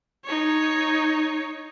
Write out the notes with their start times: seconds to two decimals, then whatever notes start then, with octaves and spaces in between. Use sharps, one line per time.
0.25 D#4 C#5